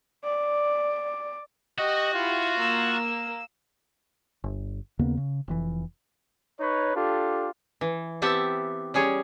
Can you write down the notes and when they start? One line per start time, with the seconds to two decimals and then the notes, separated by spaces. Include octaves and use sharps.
0.24 D5
1.79 F#4 G4 D#5
2.14 E4 F4
2.60 A#3 E6
4.44 G1
4.99 D#2 C#3 A#3 B3
5.17 C#3
5.48 F1 G#2 E3
6.60 D#4 B4 C#5
6.96 D4 F4 G4 A4
7.81 E3
8.22 B3 C4 G4 E5 F#5 A5
8.94 G3 C#4 G#4 C#5